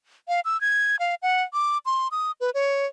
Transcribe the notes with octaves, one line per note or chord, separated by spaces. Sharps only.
F5
E6
G#6
F5
F#5
D6
C6
D#6
B4
C#5